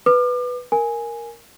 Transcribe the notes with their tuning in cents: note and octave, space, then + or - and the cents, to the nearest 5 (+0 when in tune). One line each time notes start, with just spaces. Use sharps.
B4 +0 D6 +40
A#4 +0 G#5 +0